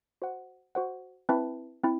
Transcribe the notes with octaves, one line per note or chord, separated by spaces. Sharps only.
F#4 C5 F#5
F#4 C5 F#5
C4 E4 B4 E5 A5
C4 E4